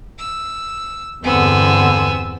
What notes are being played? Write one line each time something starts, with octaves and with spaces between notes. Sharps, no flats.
E6
E2 G2 D3 B3 C4 G#5 E6